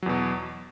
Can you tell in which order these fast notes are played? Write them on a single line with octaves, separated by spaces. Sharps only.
F#3 E2 B2